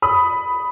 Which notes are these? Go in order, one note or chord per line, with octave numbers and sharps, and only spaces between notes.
B5 D#6